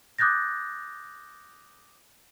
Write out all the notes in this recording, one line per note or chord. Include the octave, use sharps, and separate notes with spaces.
D6 D#6 F#6 G6 A6 A#6